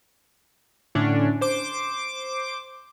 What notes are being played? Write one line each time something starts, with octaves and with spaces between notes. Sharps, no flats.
A2 D3 C#4 D4
C5 D6